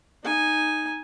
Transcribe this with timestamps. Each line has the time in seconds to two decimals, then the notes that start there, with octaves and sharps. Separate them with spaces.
0.24 D#4 G#5